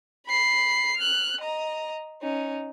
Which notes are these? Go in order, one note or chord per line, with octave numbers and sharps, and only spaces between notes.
B5 C7
F6 F#6
D#5 A#5
C#4 D#4